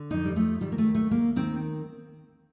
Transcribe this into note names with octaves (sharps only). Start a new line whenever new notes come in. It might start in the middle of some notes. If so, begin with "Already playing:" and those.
Already playing: D3
F2 D#4
G3
F3 A3
D#3 G3
A#3
A3
D#2
A3
D#2 A#3
D#3 C4